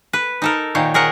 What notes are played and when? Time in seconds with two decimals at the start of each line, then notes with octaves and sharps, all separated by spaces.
0.13 B4
0.42 D#4 A4 A#4
0.75 A#2 D#3 C5 C#5
0.94 G#4 A#4 C#5 F#5